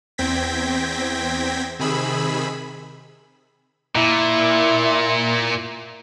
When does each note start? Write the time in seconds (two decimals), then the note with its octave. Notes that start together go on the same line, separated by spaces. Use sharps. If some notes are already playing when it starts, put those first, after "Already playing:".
0.18 E2 C4 G5 G#6 A#6 B6
1.79 C3 D#3 G#4 B5 E6
3.96 A#2 E4